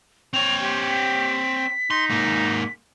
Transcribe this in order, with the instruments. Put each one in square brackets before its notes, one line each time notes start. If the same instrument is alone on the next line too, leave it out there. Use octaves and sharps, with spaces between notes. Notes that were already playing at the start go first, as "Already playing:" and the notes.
[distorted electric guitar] C4 C#5 [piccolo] F7
[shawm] G4 [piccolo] C6
[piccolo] B6
[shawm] D#4 [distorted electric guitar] C6
[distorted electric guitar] G#2 A#3